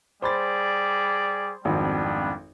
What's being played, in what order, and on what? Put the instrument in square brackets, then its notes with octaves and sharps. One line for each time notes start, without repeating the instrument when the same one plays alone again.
[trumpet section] G3 G#4 D5 [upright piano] C5 B5 A6
[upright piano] G#1 F2 [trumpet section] G3 B3 D4